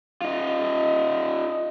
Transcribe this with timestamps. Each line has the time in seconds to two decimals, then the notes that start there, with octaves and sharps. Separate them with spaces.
0.22 D#4 F4